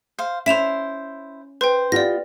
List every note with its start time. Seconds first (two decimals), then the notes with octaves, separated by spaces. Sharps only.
0.19 C5 F5
0.46 C#4 E4 C5 B6 E7 F7
1.61 B4 C5 G5
1.92 B3 F4 G4 D5 A#6